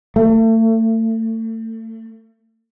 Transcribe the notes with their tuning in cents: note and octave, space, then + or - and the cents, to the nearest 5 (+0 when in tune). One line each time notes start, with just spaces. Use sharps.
A3 +35